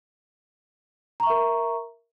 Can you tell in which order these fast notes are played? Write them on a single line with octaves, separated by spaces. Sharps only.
A#5 C#6 E5 A#4